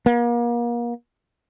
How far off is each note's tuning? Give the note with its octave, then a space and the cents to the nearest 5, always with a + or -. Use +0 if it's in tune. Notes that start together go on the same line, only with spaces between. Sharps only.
A#3 +35